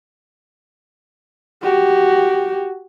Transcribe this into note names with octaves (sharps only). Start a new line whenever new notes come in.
F#4 G4